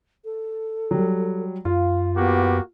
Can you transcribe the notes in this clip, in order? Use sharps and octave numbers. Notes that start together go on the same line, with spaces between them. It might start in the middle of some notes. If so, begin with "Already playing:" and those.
A4
F#3 G3
F#2 F4 F5
A#3 B3 F#4 G4